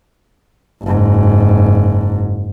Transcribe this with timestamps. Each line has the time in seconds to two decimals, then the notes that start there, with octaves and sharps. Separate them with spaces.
0.82 F#1 G#2